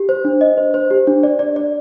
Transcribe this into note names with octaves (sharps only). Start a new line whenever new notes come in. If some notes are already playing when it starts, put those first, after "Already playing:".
Already playing: G4
C5
D4
D#5
C5
C5
G4
D4
D5
D5
D5